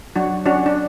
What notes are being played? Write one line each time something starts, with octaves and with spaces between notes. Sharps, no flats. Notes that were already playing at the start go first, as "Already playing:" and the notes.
F#3 D4 F#4
C#4 D4 F#4
D4